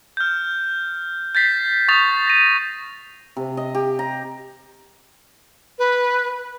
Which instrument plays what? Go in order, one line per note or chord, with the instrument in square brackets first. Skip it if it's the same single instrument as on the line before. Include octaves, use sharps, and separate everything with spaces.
[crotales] F6 G6
G6 A6 B6 C7
C#6 D#6 A6 F7
A#6 D#7
[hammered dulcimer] C3
D#5
G4
A#5
[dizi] B4